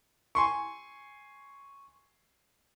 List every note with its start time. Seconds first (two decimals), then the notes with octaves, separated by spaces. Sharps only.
0.35 G#5 C6 C#6